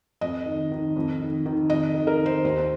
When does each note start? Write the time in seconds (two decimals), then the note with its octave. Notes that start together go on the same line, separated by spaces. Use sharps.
0.21 F2 D#5
0.46 D#3
0.72 D#3
0.96 F2
1.21 D#3
1.46 D#3
1.70 F2 D#5
1.94 D#3
2.07 A#4
2.20 D#3
2.26 C5
2.44 D#2 C5